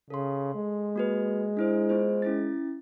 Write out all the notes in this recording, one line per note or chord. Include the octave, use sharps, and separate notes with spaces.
C#3 A4 C6
G#3
A#3 F#4 B4
D4 E4 C5
B3 F4 C5
C#4 E4 A6